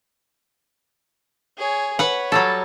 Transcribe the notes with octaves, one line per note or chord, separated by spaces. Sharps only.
G#4 C#5
B4 C#5 F#5
F#3 G3 A4